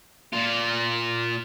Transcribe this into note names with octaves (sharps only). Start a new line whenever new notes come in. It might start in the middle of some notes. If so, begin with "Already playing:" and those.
A#2 F4